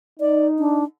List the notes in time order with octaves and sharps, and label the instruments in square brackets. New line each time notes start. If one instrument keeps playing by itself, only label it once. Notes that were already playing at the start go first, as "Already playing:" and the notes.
[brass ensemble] D#4 [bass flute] D5
[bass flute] D4